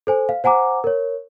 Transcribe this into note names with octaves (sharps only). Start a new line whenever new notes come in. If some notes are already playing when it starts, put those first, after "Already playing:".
A4 C5 G#5
F5
C5 F#5 G#5 A#5 D6
A#4 C#5